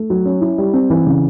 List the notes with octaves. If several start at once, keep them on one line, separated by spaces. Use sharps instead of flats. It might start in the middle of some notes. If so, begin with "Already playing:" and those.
Already playing: A3
F#3
C#4
E4
G3
C4
E3
C#3